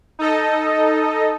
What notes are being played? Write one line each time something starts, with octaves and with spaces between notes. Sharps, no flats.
D#4 A4 D#5